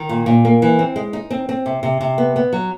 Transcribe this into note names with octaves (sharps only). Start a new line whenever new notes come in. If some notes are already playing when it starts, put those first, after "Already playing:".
Already playing: D#3
A#2
A#2
A#3
E3
C4
G#3
D#4
C4
C4
C3
C3
C3
B3
B3
F#3